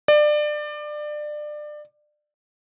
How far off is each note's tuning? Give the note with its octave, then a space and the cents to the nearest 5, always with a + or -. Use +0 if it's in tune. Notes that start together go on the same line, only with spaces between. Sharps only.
D5 +25